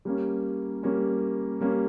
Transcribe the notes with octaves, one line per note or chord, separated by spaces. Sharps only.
G3 A#3 C#4
G3 A#3 C#4
G3 A#3 C#4